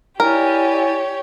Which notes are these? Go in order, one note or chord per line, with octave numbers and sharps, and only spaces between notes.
E4 G4 A#4 C#5 D5 G#5